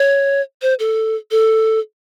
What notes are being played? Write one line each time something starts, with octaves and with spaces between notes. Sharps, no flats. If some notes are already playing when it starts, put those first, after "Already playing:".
Already playing: C#5
C5
A4
A4